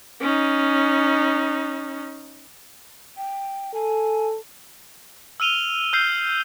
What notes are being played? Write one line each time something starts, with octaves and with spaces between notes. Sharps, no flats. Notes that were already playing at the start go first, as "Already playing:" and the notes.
C#4 D#4
G5
A4 G#5
E6 F6 D#7 F7 G7
E6 F6 G6 C7